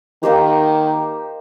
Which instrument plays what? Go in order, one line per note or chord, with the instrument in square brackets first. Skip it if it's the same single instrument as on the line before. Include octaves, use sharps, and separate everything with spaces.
[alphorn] D#3 [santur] A#3 D#4 G4 C5